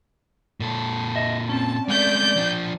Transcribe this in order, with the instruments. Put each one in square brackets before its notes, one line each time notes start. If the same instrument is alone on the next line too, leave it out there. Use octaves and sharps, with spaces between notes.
[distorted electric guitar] A#2 A4
[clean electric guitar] D#5 E5
[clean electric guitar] C4 C#4 [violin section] A5
[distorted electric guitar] G#3 A3 [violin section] D5 G6
[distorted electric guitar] F3 D4